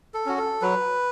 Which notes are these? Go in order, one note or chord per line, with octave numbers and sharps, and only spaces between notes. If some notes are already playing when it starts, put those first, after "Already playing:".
A4
C#4 F#4
A4
F#3 B4